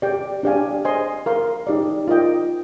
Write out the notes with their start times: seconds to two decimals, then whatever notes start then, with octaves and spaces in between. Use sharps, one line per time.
0.02 G4 D5 G5
0.43 D4 G4 D5 F5 G#5
0.85 C5 D#5 G#5 C6
1.26 A#4 F5 C6
1.67 D#4 G4 D5
2.08 F4 A#4 D#5 G5